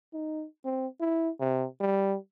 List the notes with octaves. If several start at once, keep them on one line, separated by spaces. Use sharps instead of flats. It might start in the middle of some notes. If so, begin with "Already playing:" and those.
D#4
C4
E4
C3
G3